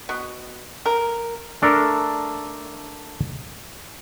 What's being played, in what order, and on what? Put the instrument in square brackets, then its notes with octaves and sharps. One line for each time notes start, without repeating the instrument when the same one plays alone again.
[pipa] B2
A#4
[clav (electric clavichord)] A3 D4 A4 A#4